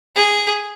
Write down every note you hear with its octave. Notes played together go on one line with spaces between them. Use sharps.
G#4